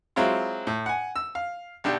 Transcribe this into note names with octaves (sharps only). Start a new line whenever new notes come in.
F#3 G#3 C4 E4 F4
A2
F#5 G#5
E6
F5
B1 D4 G4